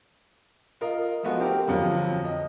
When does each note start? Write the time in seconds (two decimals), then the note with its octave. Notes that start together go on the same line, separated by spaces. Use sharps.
0.81 F4 A#4 D#5
1.23 F3 G#3 A3 B3 F#4
1.40 C4 G4 A#4
1.67 G1 F2 F#3
2.25 D#5